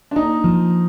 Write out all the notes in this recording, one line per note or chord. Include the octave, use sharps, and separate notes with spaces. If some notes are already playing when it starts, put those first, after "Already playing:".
D4
A#3 D#4
F3